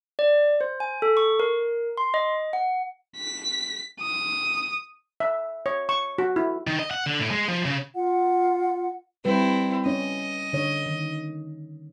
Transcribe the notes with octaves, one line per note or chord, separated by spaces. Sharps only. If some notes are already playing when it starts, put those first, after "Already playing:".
D5
C5
G#5
A4
C#6
A#4
C6
D#5
F#5
B6
D#6
E5
C#5
C#6
F#4
E4
D#3
D#5
F#5
D3
A2
G#3
F3
C#3
F4 F#5
G3 C4 E4 B4
C#4 C#5 D#5
D3 C#5
D#3